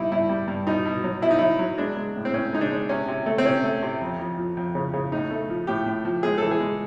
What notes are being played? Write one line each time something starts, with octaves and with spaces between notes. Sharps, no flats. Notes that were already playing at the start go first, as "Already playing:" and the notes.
Already playing: G2 G3 D#4 E4
G2 E4
G3
G2
B2 D#4
B2
F#3
B2 E4
D#4
F#3 E4
F#3
G#3 D4
G#3
A2
C4
A2 C#4
G#3 D#4
D4
G#3
C3 C#4
C3
A3
C4
C3 C#4
A3
C3
F2
F2
F3
F2
C#3
C#3
A2 D#4
A3
F3
A2 G4
A2
F3
G#3 G#4
E3 A4
G#4
G#3